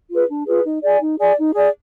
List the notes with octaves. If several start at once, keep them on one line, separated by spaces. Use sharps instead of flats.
F4 G#4 B4
D4
F4 G#4 B4
D#4
G#4 D5 G#5
D#4
G#4 D5 G#5
D#4
G#4 D5 G#5